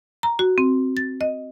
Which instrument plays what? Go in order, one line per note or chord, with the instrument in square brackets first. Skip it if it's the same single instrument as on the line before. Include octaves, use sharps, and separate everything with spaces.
[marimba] A#5
F#4
C4
A6
D#5